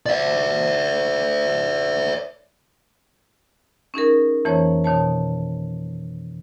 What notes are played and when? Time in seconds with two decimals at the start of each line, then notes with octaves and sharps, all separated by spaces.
0.06 D5 E5
3.94 C#4 D#4 G#4 A#4
4.45 F2 E3 A#3 C#4 C5 C#5
4.84 B2 D#3 C#5 A5